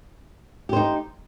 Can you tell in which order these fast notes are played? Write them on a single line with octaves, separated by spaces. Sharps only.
G4 C5 D#4